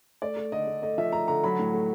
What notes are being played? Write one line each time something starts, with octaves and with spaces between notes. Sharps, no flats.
A3 D5
A3
D3 D#5
A3
A3 D#5
F3 E5
A3 A#5
D3 A#5
F#3 B5
A2
A3